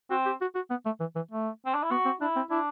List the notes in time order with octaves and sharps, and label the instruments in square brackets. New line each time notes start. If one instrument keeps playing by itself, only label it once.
[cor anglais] C4 [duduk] F#4
[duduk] G4
F#4
F#4
B3
A3
E3
E3
A3
[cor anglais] C4
D4
E4
[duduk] B3 [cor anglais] F#4
[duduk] C4
[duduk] D4 [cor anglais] E4
[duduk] C4
[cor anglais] D4 [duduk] E4